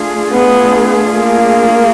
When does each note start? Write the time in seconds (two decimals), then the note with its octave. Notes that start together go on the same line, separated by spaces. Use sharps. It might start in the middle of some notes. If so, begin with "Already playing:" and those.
Already playing: A3 D4 F4 G#4
0.32 B3
1.15 A#3